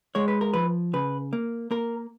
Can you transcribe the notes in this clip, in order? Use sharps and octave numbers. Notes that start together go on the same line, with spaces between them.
G#3 C#5
B4
A#4
F3 B4
C#3 B4
A#3
A#3 A#4